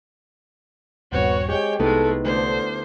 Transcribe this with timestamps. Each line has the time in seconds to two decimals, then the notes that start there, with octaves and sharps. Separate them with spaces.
1.12 D#1 A#1 G2 B3 C4 F#4 C#5
1.48 G#3 G4 C#5 G5
1.79 C2 G#3 A3 B3 D#4 E4 A4
2.25 D2 D3 C5